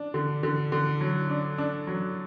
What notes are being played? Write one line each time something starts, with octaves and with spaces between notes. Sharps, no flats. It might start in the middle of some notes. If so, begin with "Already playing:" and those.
Already playing: D4
D3
D3
D3
F#3
D4
D4
F#3